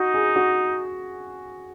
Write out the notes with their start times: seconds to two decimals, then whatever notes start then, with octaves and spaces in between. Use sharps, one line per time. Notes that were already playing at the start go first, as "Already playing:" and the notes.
Already playing: D#4 F#4
0.14 G#4
0.36 F#4